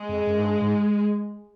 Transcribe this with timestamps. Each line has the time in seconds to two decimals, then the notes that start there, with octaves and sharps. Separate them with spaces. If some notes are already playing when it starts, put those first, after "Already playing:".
Already playing: G#3
0.09 F2
0.27 F#2
0.39 G#2
0.44 G2
0.61 G#2